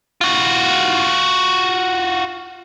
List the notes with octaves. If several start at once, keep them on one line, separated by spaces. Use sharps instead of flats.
F4 F#4